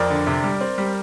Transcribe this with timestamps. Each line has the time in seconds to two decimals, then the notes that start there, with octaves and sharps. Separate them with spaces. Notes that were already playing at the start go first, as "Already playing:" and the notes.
Already playing: F2 A#4 D5
0.10 D3
0.27 C3
0.44 G3
0.61 C4
0.78 G3